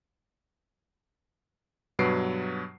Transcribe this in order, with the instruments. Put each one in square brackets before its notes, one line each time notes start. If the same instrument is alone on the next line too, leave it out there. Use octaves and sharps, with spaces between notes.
[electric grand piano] G2 B2 F#3 B4 C7 D7